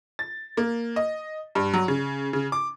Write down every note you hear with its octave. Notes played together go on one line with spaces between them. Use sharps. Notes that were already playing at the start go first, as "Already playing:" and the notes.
A6
A#3
D#5
G2
F#3
C#3
C#3
D6